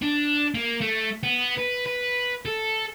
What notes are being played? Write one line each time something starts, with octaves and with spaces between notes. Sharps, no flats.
D4
A#3
A3
B3
B4
B4
A4